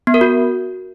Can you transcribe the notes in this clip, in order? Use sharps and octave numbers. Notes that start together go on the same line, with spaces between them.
B3
A#4
F#4